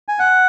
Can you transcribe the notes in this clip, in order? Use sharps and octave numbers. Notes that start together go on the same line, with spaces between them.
G#5
F#5